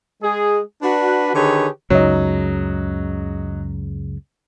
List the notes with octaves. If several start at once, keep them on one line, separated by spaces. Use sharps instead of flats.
G#3 G#4
D4 F#4 B4
D3 D#3 G4 G#4 B4 C#5
C#2 F#2 C#3 F#3 D#4